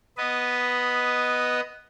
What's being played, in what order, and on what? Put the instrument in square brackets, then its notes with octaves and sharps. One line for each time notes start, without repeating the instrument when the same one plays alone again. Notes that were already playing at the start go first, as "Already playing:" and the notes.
[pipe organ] B3 B4 D#5